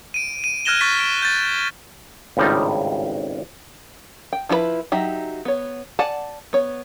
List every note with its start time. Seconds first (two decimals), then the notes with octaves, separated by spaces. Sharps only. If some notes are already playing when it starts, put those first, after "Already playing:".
0.14 D7 D#7
0.44 D#7
0.65 F6 F#6 G#6 A#6 E7 G7
0.81 C#6 A6 B6
1.00 D7
1.22 G6 A6
2.37 G#1 C#2 A2 G3 D#4 F4
4.33 G5
4.49 F3 E4 F4 B4 B5
4.92 F#3 D#4 G4 E5
5.45 B3 C#5
5.99 D5 F#5 G#5 A5
6.53 B3 C#5